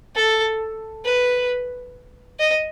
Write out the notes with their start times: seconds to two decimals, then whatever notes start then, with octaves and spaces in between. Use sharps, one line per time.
0.15 A4
1.05 B4
2.39 D#5